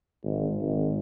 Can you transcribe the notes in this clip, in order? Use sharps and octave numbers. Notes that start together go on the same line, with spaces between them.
G#1
G#1